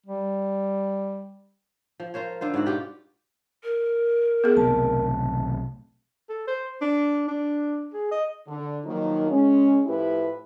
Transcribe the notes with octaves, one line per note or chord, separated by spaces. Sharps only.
G3
F3
F4 A#4 C5 C#5
D3 F4 C5
G#2 E4 F#4 F#5
B2 F4 G4 D5
A#4
B3 G#4
B1 C3 A3 A5
A4
C5
D4
D4
G#4
D#5
D3
D#3 F3 F#3 A#3 D#4
G#3 C#4
A2 F3 A3 E4 G4 B4